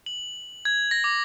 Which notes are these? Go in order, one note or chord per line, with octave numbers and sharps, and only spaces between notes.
F#7
G#6
A#6
D6